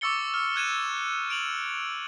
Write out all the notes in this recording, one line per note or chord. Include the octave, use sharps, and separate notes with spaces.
C#6 D6 E6 A6 C#7 G7
F6
F#6 G#6 D#7 E7
D7 F7 F#7